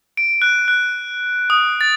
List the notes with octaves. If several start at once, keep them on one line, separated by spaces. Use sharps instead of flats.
D7
F#6
F#6
D#6
A6